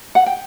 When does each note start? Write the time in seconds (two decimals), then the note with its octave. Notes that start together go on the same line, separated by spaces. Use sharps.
0.15 F#5
0.26 G5